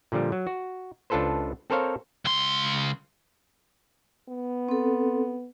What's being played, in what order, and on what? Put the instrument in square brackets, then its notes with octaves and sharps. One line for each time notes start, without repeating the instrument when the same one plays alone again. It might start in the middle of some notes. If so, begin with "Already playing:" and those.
[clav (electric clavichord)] A#2 D3 F3 G3
F#3
F#4
C#2 D4 F4 A4 B4 C5
C4 A4 A#4 C5 C#5 F5
[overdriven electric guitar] C#2 C6
[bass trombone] B3
[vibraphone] C4 A4